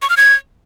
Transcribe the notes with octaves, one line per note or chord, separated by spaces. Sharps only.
C#6
F6
G#6